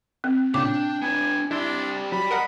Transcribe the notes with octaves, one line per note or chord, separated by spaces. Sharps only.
C4
A#2 C#3 D4 G5 D6
B3 D4 G#5
G3 D4 E4 C6
F#3 B5
A#4 D#5 F#5